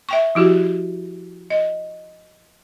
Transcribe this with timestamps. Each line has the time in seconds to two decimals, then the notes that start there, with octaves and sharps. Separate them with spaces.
0.09 E5 G5 C#6
0.35 F3 E4 F#4 G4
1.50 D#5